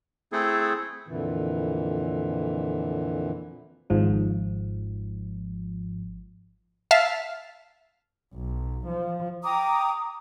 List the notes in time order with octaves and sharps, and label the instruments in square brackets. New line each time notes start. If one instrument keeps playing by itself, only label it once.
[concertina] A3 C4 E4 G#4 A4
[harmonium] F2 A#2 D3 E3
[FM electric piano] G#1 G#2 F3
[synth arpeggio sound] E5 F5 A5 F6
[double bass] B1
F3
[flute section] G5 A#5 D6 D#6